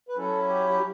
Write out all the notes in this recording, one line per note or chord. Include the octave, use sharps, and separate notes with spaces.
B4
F#3 C#4 E4 A4
G4
G4